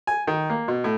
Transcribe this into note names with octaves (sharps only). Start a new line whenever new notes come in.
G#5
D#3
A#3
B2
A2